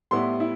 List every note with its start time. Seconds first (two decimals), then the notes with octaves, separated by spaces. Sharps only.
0.11 A2 G3 B3 E4 C6
0.40 E4